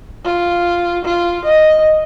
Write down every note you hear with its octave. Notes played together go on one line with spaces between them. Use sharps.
F4
F4
D#5